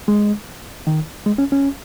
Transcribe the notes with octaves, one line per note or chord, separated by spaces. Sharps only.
G#3
D#3
G#3
C#4
C#4